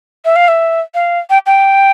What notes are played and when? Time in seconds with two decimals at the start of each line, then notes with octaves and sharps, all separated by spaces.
0.25 E5
0.36 F5
0.48 E5
0.94 F5
1.30 G5
1.46 G5